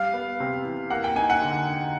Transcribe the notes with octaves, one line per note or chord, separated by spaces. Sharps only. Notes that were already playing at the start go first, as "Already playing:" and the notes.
Already playing: G3 F5
B3
C3
E3
A#3 F#5
G5
D#4 G#5
F#5
D3